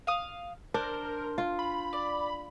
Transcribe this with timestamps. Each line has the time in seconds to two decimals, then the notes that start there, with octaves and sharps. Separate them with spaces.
0.07 F5 D#6
0.74 D4 A#4 C5
1.38 F4
1.59 B5
1.93 D5